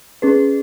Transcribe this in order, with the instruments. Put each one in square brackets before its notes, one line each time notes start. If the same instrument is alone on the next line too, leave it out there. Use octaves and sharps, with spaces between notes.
[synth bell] C#4 G#4 B4